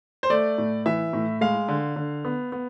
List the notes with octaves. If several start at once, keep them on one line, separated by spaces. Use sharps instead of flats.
C5
A3 D5
A2
E3 E5
A2
G#3 F5
D3
D3
B3
B3